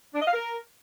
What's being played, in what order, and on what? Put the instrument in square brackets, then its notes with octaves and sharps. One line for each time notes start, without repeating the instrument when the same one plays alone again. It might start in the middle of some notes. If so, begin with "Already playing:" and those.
[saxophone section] D4
D#5
F5
A#4